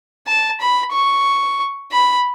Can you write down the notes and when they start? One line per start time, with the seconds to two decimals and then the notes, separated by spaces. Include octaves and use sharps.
0.27 A5
0.60 B5
0.92 C#6
1.92 B5